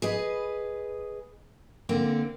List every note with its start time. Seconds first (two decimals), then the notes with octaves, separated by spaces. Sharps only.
0.02 G#4 B4 D#5
1.89 D3 A#3 C4